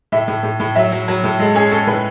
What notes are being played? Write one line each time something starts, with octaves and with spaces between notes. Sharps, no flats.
A2 E5
A2
A2
A2
F#3 E5
F#3
F#3
A2
G#3 A4
C#4 G#4
C#4 A4
A2 B4